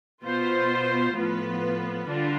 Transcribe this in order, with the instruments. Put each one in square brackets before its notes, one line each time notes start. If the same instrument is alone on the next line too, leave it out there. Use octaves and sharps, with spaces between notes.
[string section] B2 B3 F4 C5
A2 F3 B3 F4 B4
D3 G3 D4 F4